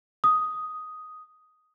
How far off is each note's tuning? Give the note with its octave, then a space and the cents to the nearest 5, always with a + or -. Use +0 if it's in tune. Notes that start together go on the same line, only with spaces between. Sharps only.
D#6 +5